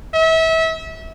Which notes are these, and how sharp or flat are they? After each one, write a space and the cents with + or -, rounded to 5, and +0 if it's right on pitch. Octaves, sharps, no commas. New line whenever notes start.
E5 -30